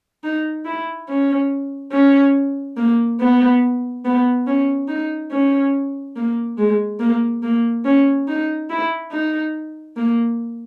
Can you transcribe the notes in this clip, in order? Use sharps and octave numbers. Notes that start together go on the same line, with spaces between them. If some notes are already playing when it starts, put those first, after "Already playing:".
D#4
E4
C#4
C#4
A#3
B3
B3
C#4
D#4
C#4
A#3
G#3
A#3
A#3
C#4
D#4
E4
D#4
A#3